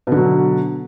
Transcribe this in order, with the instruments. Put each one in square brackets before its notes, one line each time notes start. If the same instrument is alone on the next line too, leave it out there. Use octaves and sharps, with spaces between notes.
[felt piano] B2
D3
F#3